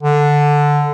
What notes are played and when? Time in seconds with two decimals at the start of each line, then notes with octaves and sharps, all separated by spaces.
0.03 D3